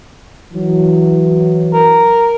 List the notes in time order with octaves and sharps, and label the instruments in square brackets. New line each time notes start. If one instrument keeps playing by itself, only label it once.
[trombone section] E3 F#3
[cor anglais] A#4